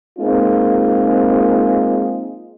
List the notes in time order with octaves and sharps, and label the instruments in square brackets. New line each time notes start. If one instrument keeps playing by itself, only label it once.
[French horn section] G#3 A#3 C4 D#4 F4